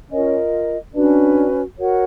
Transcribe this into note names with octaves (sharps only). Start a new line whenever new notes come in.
C#4 F4 A#4 D#5
C#4 D4 F#4 B4
F#4 A#4 C#5 F#5